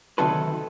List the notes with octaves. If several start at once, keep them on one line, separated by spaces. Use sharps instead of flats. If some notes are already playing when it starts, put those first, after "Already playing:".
D2 C3 D#3 F#3 A4 B4